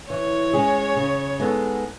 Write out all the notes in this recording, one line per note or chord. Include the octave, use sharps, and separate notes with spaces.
E3 C#5
G#3 C#4 G#4
C#3
G#3 B3 D#4 A4